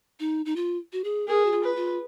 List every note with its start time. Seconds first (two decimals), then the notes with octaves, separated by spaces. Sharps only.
0.20 D#4
0.46 D#4
0.56 F4
0.93 F#4
1.04 G#4
1.28 G#4 A#4
1.45 F#4
1.52 F4
1.64 B4
1.76 F4